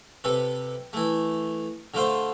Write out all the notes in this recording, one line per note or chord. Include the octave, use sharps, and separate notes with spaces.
C3 A4 B4
E3 A3
D3 A3 F4 C5